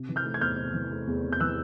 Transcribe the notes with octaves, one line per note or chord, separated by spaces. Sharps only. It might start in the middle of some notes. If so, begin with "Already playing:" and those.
Already playing: C3
E3
F6 G6
A3
G#6
E2 F6 G6
C3
E3
A3
E2
C3
G6
E3 E6 F#6